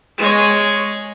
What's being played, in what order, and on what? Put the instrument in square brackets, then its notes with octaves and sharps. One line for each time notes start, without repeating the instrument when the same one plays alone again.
[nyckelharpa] G#3 C#5